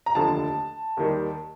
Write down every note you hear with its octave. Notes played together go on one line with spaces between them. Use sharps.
A#5
F1 D#2 D3 F3 A5
D#2 D#3 G3